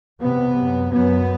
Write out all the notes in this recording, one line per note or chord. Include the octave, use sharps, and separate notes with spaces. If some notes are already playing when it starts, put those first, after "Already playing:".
E2 C3 B3
F#2
F#2 B3